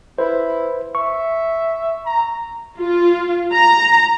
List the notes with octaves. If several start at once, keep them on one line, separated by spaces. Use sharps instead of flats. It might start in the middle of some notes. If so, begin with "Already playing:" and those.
E4 B4 C5
E5 C#6
A#5
F4
A#5